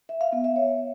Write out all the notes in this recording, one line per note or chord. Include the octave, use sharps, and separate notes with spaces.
E5
F5
B3
E5
C#5